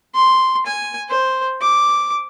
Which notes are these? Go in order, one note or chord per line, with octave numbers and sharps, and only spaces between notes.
C6
G#5
C5
D6